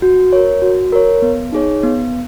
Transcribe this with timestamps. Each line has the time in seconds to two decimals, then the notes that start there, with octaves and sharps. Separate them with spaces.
0.02 F#4
0.33 A#4 C#5
0.62 F#4
0.92 A#4 C#5
1.22 B3
1.52 D#4 G#4 C#5
1.83 B3